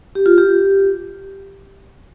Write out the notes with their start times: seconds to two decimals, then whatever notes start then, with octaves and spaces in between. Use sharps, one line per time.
0.15 G4
0.26 F4
0.38 G4